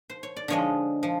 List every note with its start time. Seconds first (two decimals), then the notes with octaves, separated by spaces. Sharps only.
0.10 C5
0.23 C#5
0.36 D5
0.48 D3 F3 G#3 C#5 D#5
1.03 F3